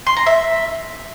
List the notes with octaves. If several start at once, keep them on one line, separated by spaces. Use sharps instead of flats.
C6
A#5
E5